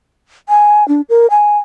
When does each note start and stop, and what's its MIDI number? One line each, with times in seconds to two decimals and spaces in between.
0.49 0.86 80
0.88 1.01 62
1.09 1.27 70
1.31 1.58 80